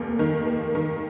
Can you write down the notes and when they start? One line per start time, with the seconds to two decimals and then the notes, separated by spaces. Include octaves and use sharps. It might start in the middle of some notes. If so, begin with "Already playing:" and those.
Already playing: F1 D#2 A#3
0.19 D#3
0.47 A#3
0.75 D#3